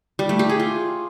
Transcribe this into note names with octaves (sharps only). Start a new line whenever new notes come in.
G3
A3
G4
G#4
F4